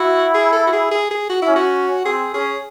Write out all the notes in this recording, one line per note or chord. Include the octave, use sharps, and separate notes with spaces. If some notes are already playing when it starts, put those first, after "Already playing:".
Already playing: E4 F#4
G#4
A4
F#4
G#4
G#4
G#4
F#4
E4
C#4
F#4
C4 G#4
C#4 G#4